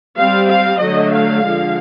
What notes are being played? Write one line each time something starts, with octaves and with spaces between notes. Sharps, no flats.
G3 C4 F5
F5
D3 F#3 A3 D#5
F5
D3 F3 G#3